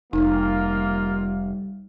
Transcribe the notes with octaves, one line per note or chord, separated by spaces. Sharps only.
F1 G3 A#3 D#4 F4